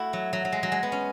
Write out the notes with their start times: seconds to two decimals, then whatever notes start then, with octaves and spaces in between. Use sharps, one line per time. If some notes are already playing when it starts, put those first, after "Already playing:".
Already playing: A3 E4 F#4
0.13 F#3
0.33 F#3
0.45 F#3
0.52 G#3
0.63 F#3
0.72 G#3
0.83 B3
0.92 C#4